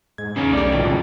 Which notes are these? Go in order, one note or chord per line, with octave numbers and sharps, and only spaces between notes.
G#2 G#6
E2 C#3 A#3 C#4 D#4
B1 G3 A3 D5
A2 C3 D#3 F3 A3 D4 G5
F#2 C#3